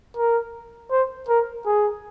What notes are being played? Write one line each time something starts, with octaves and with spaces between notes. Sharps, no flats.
A#4
C5
A#4
G#4